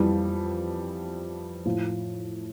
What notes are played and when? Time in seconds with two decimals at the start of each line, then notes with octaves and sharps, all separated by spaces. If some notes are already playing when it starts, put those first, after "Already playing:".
Already playing: F2 E3 G3
1.66 A2 F3